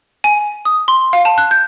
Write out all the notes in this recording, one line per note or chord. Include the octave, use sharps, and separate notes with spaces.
G#5
D#6
C6
F5
A5
F#6
G6